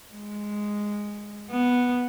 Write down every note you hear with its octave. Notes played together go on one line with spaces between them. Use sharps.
G#3
B3